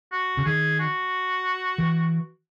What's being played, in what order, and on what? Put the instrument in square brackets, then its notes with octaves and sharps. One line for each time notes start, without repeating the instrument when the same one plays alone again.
[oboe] F#4
[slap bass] C#3
[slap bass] D#3 [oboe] G#4
[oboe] F#4
[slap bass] E3